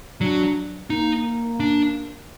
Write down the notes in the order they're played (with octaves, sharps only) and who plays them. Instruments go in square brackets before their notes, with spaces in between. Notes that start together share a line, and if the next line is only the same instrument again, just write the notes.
[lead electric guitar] F#3 [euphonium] D4
[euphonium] A#3 [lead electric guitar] D#4
[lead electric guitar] D4